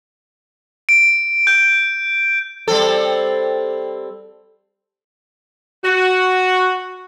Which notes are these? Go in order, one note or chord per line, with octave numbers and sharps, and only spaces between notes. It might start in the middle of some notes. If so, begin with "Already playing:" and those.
D7
G6
G3 C4 A4
F#4